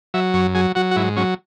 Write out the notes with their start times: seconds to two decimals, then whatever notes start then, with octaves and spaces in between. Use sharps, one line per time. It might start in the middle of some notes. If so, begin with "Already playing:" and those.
0.14 F#3 E5
0.34 F#2 C#5
0.55 F#3 G#4
0.75 F#3 F#4
0.91 F#4
0.96 G#2 E4
1.16 F#3 C#4